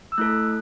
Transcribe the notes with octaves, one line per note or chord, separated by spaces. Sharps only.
E6
A3 E4 A4 F#6